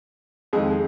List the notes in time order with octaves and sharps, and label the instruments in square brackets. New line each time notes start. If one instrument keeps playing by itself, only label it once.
[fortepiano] F2 D#3 G#3 G#4